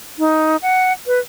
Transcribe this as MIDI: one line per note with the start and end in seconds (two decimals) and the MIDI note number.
0.19 0.57 63
0.62 0.93 78
1.07 1.19 71